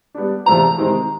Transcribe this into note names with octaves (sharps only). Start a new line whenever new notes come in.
G3 B3 D4
E2 C3 F3 A3 C4 A#5
C3 D#3 G#3 C4